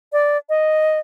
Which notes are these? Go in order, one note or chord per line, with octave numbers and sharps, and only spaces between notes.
D5
D#5